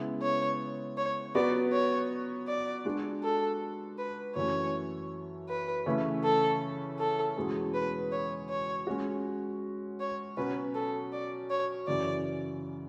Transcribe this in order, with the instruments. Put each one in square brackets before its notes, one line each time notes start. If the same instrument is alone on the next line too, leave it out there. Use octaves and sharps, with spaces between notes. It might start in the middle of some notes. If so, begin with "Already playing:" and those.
Already playing: [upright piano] C#3 G#3 B3 E4 B4
[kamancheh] C#5
C#5
[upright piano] F#3 B3 F#4 B4 [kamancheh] D5
[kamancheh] C#5
D5
[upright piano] G#3 D4 F#4
[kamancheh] A4
B4
[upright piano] F#2 E3 A3 C#4 [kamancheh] C#5
[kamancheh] B4
[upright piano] C#3 E3 A3 C#4 E4
[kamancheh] A4
A4
[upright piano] E2 B2 G#3 C#4 G#4
[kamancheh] B4
C#5
C#5
[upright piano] G#3 C#4 F#4
[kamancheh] C#5
[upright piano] B2 F#3 C#4 [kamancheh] B4
[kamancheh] A4
D5
C#5
[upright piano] F#2 C#3 E3 [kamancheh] D5